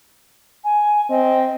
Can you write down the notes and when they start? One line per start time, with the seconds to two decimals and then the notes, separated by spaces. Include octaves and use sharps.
0.64 G#5
1.09 C4 D#5